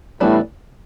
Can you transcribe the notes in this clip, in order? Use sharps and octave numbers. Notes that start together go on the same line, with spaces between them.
A2 E3 G3 B3 D4